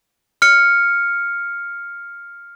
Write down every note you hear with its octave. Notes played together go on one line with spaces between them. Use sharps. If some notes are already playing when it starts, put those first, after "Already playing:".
F6 C#7